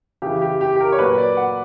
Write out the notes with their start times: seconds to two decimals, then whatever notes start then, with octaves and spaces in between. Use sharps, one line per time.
0.22 C#3 E3 G4
0.41 G4
0.61 G4
0.76 G4
0.80 A#4
0.92 C#5
0.99 A#2 F#3 B4
1.18 D5
1.37 F#5